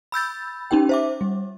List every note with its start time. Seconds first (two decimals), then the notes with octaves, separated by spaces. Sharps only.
0.12 B5 E6 G6 A6
0.71 C#4 D#4 G4 G5
0.89 C5 E5 D6
1.21 G3